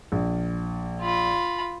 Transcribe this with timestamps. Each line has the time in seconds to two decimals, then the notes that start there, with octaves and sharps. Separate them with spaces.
0.12 A#1
1.01 F4 B5